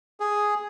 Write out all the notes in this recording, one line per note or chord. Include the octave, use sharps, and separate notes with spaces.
G#4